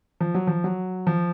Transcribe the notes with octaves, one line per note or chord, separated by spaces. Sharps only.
F3
F#3
F3
F#3
F3